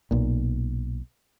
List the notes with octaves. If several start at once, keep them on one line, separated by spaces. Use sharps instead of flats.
B1 A#2